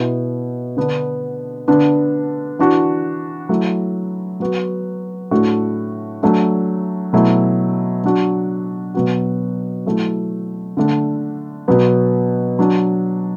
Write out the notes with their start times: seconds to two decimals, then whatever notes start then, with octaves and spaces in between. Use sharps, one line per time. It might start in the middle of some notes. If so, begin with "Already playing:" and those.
Already playing: B2 B3 E4
0.77 D3 B3 D4
1.68 D3 B3 D4
2.59 E3 D4 F#4
3.49 F#3 A3 E4
4.40 F#3 B3 F#4
5.31 A2 A3 D4 F#4
6.23 F#3 A3 D4
7.13 B2 F#3 A3 E4
8.04 F#3 D4 F#4
8.94 B2 F#3 B3 F#4
9.86 F#3 A3 E4
10.77 D3 A3 D4
11.68 B2 F#3 B3
12.59 F#3 D4 F#4